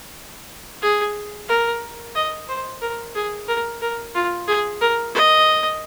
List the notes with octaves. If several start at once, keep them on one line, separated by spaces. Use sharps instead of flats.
G#4
A#4
D#5
C5
A#4
G#4
A#4
A#4
F4
G#4
A#4
D#5